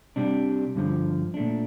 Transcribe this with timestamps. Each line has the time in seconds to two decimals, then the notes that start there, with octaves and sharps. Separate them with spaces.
0.16 C3 G3 D4
0.75 G2 D3 F3
1.34 A#2 A3 D4